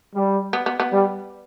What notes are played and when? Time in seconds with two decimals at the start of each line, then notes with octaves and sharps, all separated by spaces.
0.14 G3
0.53 B3
0.66 B3
0.80 B3
0.92 G3